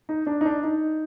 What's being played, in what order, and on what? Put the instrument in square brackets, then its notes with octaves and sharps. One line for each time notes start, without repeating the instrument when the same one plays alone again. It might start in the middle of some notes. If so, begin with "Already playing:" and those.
[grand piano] D#4
D4
D#4
D4
D#4